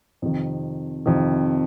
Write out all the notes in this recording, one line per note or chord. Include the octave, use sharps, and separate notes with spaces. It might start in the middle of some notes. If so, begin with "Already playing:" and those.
F2 C3 D#3
F2 C3 D#3